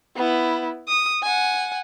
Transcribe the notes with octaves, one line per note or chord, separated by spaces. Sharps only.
B3 E4
D#6
F#5 G#5